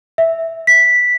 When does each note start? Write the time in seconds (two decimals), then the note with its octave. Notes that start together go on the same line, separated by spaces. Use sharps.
0.18 E5
0.67 B6